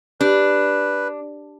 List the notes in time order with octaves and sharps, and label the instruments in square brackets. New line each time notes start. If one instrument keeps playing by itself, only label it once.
[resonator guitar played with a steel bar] D4 [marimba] G4 [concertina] B4